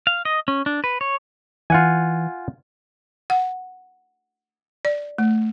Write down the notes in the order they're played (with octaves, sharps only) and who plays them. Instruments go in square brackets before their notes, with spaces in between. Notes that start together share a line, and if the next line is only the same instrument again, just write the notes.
[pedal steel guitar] F5
D#5
C#4
D4
B4
C#5
[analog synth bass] E3 [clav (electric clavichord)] F4 F#5 G#5
[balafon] F#5
D5
A3